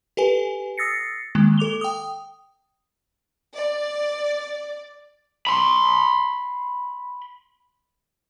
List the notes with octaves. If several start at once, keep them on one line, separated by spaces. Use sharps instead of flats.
G4 A4 B4 G#5
D#6 E6 A6 A#6 C7 C#7
D#3 G#3 A#3
A4 D6 F7 G7
G5 D#6
D5
B5 C6